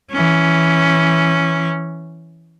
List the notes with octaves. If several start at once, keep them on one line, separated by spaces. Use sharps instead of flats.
E3 C#4